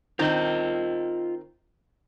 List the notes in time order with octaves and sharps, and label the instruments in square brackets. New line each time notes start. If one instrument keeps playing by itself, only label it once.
[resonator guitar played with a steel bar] D#3 C4 [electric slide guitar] F4 D#5